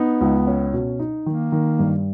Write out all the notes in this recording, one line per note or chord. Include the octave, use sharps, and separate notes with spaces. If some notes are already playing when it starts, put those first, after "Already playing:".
Already playing: B3 D#4
C#2
C#4
B2
D#4
D#3 A#3
D#3
G2